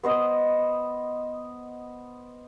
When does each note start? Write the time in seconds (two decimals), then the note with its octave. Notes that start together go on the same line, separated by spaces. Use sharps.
0.03 B3 C5 D#5